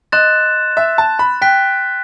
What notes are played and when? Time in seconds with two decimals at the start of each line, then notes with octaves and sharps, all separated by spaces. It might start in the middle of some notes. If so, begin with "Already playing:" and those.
0.12 D#5 C6 F#6 A6 E7
0.77 E5
0.98 A5
1.19 B5
1.42 G5 F#6 B6